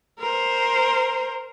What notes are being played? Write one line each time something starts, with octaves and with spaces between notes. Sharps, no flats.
A#4 C5